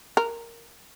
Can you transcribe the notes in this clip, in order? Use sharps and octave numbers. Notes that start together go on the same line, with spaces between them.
A#4